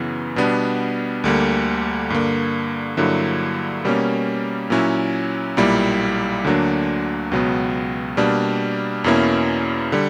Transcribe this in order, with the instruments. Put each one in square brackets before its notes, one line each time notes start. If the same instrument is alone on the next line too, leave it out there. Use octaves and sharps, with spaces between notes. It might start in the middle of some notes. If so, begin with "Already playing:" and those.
Already playing: [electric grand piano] F#2 C#3 E3 B3
B2 G3 B3 D4
D2 D3 G3 A#3
G2 D3 A#3
G2 D3 F#3 A#3 E4
B2 G3 A#3 C#4
A#2 F#3 C#4 E4
B1 A#2 G3 A#3 E4
D2 D3 F#3 A#3 D4
C#2 B2 F#3 B3
B2 G3 A#3 D4
E2 B2 A#3 C#4 E4
D3 G3